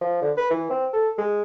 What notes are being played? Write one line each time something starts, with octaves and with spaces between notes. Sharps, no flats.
F3
D3
B4
E3
C4
A4
G#3